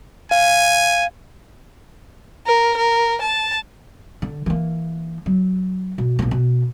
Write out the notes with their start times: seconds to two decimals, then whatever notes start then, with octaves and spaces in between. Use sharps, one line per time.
0.31 F5 G#5
2.47 A#4
2.77 A#4
3.22 A5
4.22 D3
4.46 E3 A#3
5.26 F#3
5.98 B2
6.19 A#1 A#3
6.31 B2